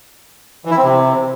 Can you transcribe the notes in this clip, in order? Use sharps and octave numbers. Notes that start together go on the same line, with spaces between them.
E3
E4
C4
C3